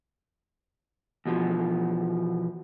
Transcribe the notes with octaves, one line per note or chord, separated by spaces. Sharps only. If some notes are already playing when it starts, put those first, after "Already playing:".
E2 B2 F3